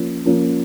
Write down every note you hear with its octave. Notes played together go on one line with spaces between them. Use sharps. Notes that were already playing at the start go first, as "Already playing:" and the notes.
Already playing: F3 A#3 C#4
F3 A#3 C#4